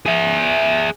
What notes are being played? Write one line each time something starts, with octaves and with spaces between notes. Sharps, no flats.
G#4 E5